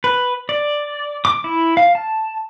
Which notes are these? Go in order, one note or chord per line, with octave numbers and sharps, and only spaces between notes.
B4
D5
D6
E4
F5
A5